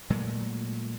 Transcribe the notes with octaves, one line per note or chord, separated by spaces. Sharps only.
A#2 F#3 G#3 A3